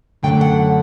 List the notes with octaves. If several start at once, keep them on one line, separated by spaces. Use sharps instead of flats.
F#2 D3 F#3 A3 G5
F#5